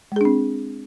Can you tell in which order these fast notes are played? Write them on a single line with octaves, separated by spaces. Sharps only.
G#3 G#4 D4 C4